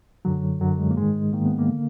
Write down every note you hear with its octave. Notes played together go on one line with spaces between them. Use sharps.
F#2 D3 F#3
F#2 D3 F#3
G#3
A#3
G#2 D#3 G#3
G#2 D#3 A#3
B3
A#3
D3